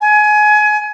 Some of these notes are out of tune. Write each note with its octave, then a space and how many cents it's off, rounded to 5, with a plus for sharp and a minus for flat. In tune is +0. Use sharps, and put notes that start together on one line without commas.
G#5 +25